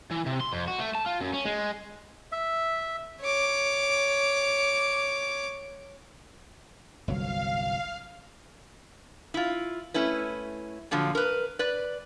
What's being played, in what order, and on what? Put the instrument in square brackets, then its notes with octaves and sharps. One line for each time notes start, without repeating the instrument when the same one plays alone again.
[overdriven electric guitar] E3
C3
C6
F2
F#4
A3
A5
F4
F#2
C#4
G#3
[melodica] E5
[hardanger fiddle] C#5 D6
[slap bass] G1 C2 F#3 [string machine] F5
[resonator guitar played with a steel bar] E4 F4
A3 C#4 E4 B4
A#2 D3 F3 F#3
A#4 B4
B4 D5